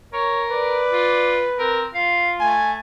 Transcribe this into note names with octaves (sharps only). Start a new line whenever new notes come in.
A#4 C#5
B4 D5
F4
C4 A#4
F4 F5
A3 G#5